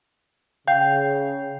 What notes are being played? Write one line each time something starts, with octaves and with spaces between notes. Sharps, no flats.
C#3 F5 G5 G6